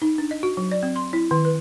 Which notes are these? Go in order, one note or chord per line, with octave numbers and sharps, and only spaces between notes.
D#4
D4
D#5
F#4
F#3
D5
C4
C6
E4
D#3
B4